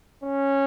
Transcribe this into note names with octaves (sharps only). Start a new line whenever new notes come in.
C#4